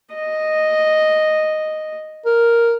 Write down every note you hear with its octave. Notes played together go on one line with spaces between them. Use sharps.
D#5
A#4